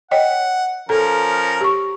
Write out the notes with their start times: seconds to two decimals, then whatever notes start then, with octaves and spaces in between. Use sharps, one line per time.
0.11 C#5 D#5 F#5 G5
0.89 F3 C#4 A4 A#4 A#5
1.61 G4 C#6